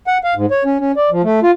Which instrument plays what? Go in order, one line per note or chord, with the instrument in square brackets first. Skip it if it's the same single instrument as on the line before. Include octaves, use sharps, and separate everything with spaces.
[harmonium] F#5
F5
G#2
C#5
C#4
C#4
D5
F3
A3
F4